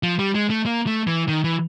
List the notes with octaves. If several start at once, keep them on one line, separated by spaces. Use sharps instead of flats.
F3
G3
G#3
A3
A#3
A3
E3
D#3
E3